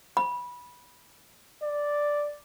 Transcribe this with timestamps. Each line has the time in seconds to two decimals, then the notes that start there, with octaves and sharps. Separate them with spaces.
0.17 B5
1.63 D5